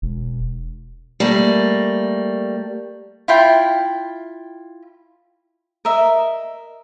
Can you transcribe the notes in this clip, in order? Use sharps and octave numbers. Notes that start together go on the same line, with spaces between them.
E1
G3 A3 A#3
E4 F4 G5
A#4 D#5 E5